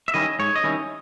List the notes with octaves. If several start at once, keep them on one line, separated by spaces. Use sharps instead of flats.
E5
D#3 G3 C#4 E4 D#5
G#2 C#5
D#5
D#3 G3 C#4 E4